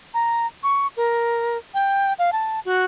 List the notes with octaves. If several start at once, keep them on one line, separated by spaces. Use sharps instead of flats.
A#5
C#6
A#4
G5
F5
A5
F#4